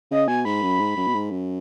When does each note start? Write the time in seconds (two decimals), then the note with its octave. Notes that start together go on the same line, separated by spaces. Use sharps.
0.11 C#3 D#5
0.28 B2 G#5
0.45 G#2 B5
0.63 F#2
0.79 G#2
0.97 F#2
1.07 B2
1.14 G#2
1.31 F#2